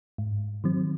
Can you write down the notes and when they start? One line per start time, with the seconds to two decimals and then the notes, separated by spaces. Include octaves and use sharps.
0.18 G#2
0.64 D#3 F#3 C4